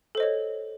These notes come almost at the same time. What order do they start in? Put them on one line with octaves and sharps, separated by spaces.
A4 C5 D#5 C#5